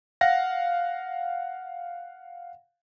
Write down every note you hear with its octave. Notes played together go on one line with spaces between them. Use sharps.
F5 F#5 A#6